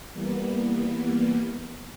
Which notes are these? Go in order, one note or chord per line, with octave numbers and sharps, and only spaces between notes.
E3 G3 A#3 B3